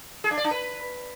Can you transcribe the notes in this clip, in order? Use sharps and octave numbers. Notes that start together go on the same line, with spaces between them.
G#4
D4
D5
D4
B4